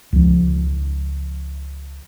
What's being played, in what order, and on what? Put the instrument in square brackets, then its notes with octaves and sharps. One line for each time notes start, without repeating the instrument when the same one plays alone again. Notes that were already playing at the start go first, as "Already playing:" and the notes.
[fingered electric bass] C#2 F3